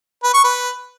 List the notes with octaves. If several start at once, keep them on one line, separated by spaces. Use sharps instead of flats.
B4
C#6
B4